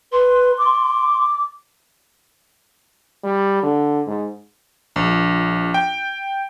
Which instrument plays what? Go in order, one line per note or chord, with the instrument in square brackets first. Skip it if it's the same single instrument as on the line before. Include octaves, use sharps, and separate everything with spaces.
[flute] B4 [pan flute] C6
[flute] D6
[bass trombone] G3
D3
G#2
[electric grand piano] A#1
G5